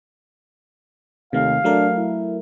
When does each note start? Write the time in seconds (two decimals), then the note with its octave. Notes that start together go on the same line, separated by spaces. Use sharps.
1.33 D#2 C3 D#3 A3 F5
1.64 F#3 A3 D4 A#4
1.97 E4